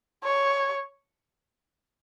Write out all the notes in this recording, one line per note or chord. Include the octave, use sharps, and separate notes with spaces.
C#5